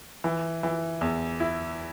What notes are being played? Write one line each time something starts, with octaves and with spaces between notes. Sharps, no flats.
E3
E3
E2
E4